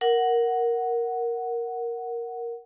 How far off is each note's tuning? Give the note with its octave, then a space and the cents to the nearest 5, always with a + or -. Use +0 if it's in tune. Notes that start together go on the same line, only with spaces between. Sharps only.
A#4 +0 F#5 +0